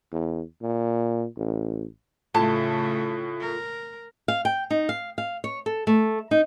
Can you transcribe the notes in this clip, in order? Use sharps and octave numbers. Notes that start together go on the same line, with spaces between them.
E2
A#2
A1
A2 C#3 A3 F4 A4 A5
A#4
F5
G5
D#4
F5
F5
C#5
A4
A3
D#4